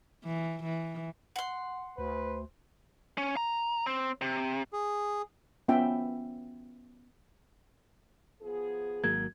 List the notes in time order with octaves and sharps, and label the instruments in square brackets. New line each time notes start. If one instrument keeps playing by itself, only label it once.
[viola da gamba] E3
E3
[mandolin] F#5 C6
[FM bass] D2 [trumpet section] B4 C5
[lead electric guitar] C#4
A#5
C4
C3
[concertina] G#4
[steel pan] B3 C#4 F4 E5 G5
[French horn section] F3 B3 G#4
[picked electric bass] G#1 F#3 A#3 [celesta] G#6